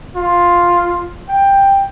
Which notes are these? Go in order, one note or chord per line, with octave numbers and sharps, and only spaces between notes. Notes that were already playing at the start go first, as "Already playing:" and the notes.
F4
G5